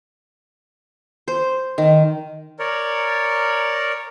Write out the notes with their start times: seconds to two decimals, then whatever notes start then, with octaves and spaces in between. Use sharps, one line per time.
1.28 C5
1.78 D#3
2.59 A#4 C#5 D5